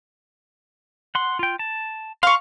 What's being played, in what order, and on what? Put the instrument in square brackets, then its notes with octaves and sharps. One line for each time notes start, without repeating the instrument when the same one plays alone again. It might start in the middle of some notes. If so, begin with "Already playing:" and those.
[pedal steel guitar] F#5 C6
F4 G5
A5
[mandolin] F5 C#6 [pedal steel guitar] C6